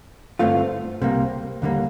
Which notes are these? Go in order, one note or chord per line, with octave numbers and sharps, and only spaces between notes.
G2 D3 A3 C4 F4
C2 C3 G3 A#3
D#2 D3 G3 A#3